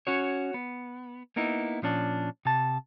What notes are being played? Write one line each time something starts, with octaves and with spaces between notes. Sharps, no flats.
C#4 F#4 C#5
B3
A#3 B3 D#4 E4
A#2 F3 C#4 D4
C3 A5